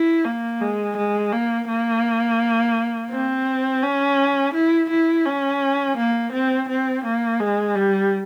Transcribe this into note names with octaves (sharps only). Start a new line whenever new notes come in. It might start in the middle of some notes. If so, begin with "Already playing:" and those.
Already playing: E4
A#3
G#3
G#3
A#3
A#3
C4
C#4
E4
E4
C#4
A#3
C4
C4
A#3
G#3
G3